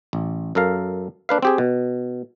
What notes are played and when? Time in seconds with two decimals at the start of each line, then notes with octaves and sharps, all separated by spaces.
0.13 A1
0.55 F#2 A4 A#4 F5
1.29 A#3 D4 B4 F5
1.42 C4 G4 G#4
1.58 B2